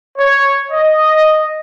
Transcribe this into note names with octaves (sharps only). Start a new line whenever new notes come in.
C#5
D#5